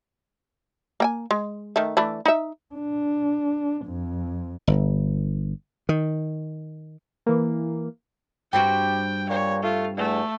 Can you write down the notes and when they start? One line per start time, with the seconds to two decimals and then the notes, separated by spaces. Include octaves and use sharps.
1.00 A#3 G5 G#5
1.31 G#3
1.76 D#3 A3
1.97 E3 A3 D4
2.25 D#4 E5
2.74 D4
3.86 F2
4.67 G1
5.89 D#3
7.26 E3 A#3
8.53 G2 C4 F#4 G4 G5
9.30 A#2 C#5
9.63 A3 F4
9.97 E2 A3